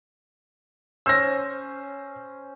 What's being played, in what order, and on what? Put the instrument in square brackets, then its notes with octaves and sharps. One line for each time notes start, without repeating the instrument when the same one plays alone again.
[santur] C#4 C5 [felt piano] E6 A#6